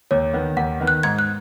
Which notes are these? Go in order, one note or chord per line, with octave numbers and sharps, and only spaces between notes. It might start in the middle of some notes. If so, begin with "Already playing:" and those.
D#2 C#5
D#3 B3
D#2 F#5
D#3 B3
F#6
G#2 G#6
F#6